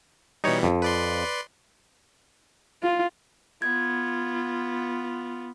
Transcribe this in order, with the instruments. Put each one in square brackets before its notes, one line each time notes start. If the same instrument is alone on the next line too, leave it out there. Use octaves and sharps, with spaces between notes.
[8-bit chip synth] B2 E3 G3 [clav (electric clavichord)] D#4 C#5
[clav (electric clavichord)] F2
[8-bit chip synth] B4 D5 C6
[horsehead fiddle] F4
[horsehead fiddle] B3 F4 [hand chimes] G#6